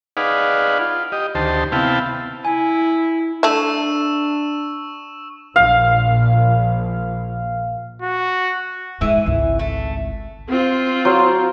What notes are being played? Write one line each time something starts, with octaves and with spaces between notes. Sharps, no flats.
D#4 G#4 B4 D5 F5 F#5
F4
G4 D#5
D2 D#3 G4 C5 A5
C3 B3 E4 F5 G5 A5
E4 G#5
A3 D4 E5 C#6 E6 E7
A#1 F5
F#4
G#2 E3 E4 G#5
G#1 C#2
A3
C4 F4
F#3 C5 F5